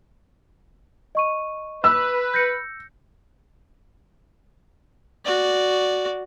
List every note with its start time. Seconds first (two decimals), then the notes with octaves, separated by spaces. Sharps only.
1.15 D#5 C#6 D#7
1.84 B4 E6
2.34 G6 A#6 C#7
5.25 F#4 D5